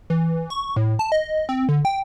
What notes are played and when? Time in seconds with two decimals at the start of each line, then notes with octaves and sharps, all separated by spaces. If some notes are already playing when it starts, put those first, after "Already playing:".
0.10 E3
0.50 C#6
0.76 A2
0.99 A5
1.12 D#5
1.49 C4
1.69 D3
1.85 G5